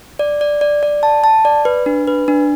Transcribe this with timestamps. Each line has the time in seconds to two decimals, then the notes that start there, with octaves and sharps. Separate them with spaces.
0.19 D5
0.41 D5
0.61 D5
0.83 D5
1.03 A5
1.24 A5
1.45 D5
1.65 B4
1.86 D4
2.07 B4
2.28 D4